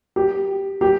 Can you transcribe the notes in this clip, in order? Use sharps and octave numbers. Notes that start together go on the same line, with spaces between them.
G4
G4